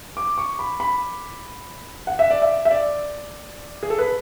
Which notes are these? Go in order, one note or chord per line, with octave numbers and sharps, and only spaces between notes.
D6
C#6
B5
B5
F#5
E5
D5
E5
E5
D5
G#4
A4
B4